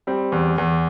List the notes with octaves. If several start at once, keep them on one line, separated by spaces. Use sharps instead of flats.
G3 C4
E2
E2